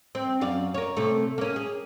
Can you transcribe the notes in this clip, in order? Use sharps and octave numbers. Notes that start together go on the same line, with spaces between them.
C4
F#2 D5 F5
A#4 C#5
C3 A3
A#3 C#4
G#4